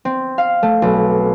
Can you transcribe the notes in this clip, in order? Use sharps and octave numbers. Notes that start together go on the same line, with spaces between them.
C4
F5
A3
B1